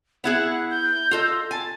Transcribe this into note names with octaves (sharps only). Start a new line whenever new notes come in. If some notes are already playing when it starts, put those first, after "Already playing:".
B3 E4 G#4 F#5
G6
F4 A4 D#5
G#5 A5